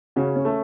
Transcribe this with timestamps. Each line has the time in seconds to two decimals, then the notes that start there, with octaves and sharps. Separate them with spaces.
0.16 C#3 C#4 F#4
0.36 C#4
0.45 A3